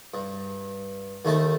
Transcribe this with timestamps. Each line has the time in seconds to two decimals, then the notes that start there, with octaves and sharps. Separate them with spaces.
0.14 G2
1.25 D#2 D#3 A3 D#4 A4 A5